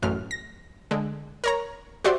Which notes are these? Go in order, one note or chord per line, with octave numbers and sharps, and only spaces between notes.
A1 F#2 F6
A#6
D3 G#3
A#4 C#5 A#5
F#4 G4 C5 D5 E5 C6